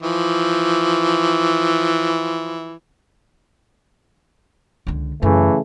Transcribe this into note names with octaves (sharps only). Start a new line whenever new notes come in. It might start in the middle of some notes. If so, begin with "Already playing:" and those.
E3 F3
C#2 D3
F#2 C#3 E3 A3